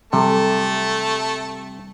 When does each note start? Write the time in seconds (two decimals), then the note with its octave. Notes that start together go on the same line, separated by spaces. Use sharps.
0.13 C3 G3 A3 A4 A5